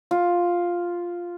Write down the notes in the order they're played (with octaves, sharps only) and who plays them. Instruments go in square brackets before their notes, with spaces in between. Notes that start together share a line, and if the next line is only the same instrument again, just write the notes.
[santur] F4